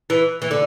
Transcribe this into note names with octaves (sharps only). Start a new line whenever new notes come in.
E3
E3
D3